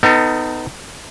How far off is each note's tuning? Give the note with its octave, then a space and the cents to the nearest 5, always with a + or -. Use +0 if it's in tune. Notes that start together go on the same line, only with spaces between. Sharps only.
B3 +30 D#4 +0 A4 +35